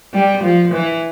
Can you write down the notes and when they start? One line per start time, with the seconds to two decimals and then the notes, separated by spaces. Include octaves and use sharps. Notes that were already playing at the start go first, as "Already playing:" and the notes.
0.13 G3
0.43 F3
0.73 E3